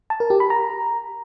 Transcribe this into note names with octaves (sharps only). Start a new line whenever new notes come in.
A5
A#4
G4
B5
A#5